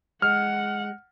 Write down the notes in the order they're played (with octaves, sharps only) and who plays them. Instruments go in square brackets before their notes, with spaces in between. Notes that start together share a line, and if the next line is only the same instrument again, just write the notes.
[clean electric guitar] G#3 [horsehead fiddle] F#5 [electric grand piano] F6